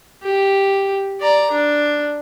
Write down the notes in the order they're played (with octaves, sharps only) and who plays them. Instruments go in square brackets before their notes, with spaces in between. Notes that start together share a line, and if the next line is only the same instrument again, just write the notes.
[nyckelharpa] G4
D5 A#5
D4